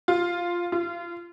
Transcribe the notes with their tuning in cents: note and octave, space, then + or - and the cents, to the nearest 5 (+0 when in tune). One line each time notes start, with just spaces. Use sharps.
F4 -5
F4 -30